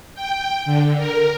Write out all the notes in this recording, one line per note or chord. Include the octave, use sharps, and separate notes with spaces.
G5
D3
A#4